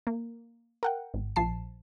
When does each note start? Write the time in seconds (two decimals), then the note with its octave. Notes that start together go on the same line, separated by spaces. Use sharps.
0.07 A#3
0.83 A#4 F#5 G5
1.14 G#1
1.36 A#1 F3 A5 C7